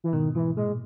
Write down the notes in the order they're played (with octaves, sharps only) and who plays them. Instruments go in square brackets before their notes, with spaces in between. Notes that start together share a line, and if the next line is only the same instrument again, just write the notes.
[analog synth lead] E3
[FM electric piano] G#2 B2 [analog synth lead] D#3
[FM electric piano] G#2 [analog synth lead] E3
[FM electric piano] A#2 [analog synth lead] G#3